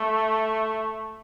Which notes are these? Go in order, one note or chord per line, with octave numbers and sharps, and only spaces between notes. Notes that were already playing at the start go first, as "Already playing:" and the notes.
Already playing: A3